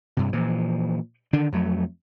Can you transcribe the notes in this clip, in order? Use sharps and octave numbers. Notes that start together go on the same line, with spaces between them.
G2 C3
A#2 E3 F3
D3 D#3 D4
F2 F#3 A3